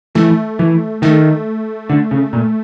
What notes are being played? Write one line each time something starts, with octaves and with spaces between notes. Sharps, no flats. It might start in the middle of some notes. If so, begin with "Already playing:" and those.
E3 A3
E3
D#3 A3
D3
C#3
A#2